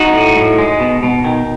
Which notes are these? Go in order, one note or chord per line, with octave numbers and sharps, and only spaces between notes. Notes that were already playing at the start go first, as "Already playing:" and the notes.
Already playing: D#4 F#4
A2
A2
G#3
B2
B2
D#3